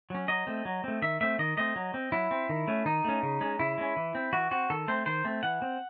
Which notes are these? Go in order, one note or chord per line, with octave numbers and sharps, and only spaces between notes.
F#3 C#4
F#3 D#5
A3 C4
F#3
A3 C4
D#3 E5
A3 C4 E5
D#3 D#5
A3 C4 D#5
F#3
C4
F#3 E4
C4
D#3
A3 C#4
D#3 D#4
A3 C#4
C#3
G#3 C#4
C#3 E4
G#3 C#4
E3
C4
E3 F#4
C4 F#4
D#3 A4
A3 C4 C5
D#3 C5
A3 C4
E3 F#5
C4